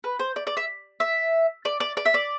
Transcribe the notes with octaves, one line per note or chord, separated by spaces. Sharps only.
B4
C5
D5
D5
E5
E5
D5
D5
D5
E5
D5